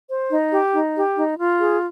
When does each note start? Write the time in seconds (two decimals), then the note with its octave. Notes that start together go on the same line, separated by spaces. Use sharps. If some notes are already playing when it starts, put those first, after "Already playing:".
0.09 C5
0.31 D#4
0.52 G4
0.74 D#4
0.95 G4
1.16 D#4
1.39 F4
1.60 G#4